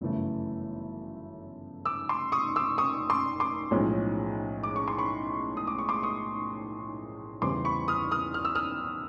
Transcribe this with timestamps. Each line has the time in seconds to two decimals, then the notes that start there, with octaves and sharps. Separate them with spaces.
0.01 G1 F#2 C#3 E3 A3
1.85 D6 E6
2.09 C6 D6
2.32 C#6 D#6
2.56 D6 E6
2.78 C#6 D#6
3.10 C6 D6
3.40 C6 D6
3.71 B1 A2 F3 G#3 C#4
4.63 D6
4.76 C#6
4.88 C6
4.98 B5 C#6
5.57 D#6
5.67 D6
5.78 C#6
5.89 C6 D6
6.03 C#6 D#6
7.42 E2 C#3 E3 G3 C4 C6 D6
7.65 B5 C#6
7.88 D#6 F6
8.11 D#6 F6
8.34 F6
8.45 E6
8.55 D#6 F6